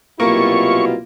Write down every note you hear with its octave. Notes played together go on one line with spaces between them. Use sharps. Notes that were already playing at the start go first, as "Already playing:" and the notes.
C2 B2 F#3 A#3 E4 F4 G4 C#6